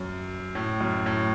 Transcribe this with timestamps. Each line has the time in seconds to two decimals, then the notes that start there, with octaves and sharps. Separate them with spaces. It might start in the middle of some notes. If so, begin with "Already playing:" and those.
Already playing: F#2
0.55 A2
0.81 F#2
1.06 A2